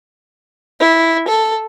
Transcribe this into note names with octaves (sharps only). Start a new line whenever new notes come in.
E4
A4